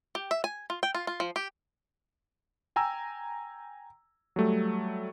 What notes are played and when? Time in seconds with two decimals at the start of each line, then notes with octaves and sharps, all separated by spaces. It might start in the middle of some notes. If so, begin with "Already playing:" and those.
0.15 G4
0.31 E5
0.44 G#5
0.70 F4
0.83 G5
0.95 F4
1.07 F4
1.20 F3
1.36 G4
2.76 G5 G#5 A#5 E6
4.36 F#3 G3 A3